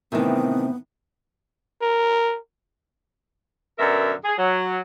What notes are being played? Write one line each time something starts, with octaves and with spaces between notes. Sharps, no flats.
A2 C3 D#3 E3 B3 C4
A#4
F#2 B2 D3 A#4 E5
G#4
F#3